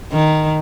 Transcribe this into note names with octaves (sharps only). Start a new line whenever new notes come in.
D#3